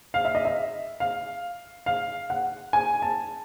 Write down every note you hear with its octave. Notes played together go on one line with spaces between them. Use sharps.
F5
E5
D#5
E5
F5
F5
F#5
G#5
A5